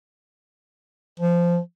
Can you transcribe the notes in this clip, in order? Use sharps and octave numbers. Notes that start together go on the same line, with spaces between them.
F3